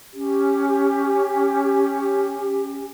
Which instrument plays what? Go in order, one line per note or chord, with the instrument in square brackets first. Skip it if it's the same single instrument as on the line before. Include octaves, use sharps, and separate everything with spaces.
[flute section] C#4 G4